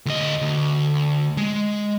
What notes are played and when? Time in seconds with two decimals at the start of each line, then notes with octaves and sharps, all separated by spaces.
0.06 D2 D#5
0.42 D2
1.37 G#3